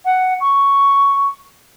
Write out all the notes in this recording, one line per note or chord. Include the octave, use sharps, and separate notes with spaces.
F#5
C#6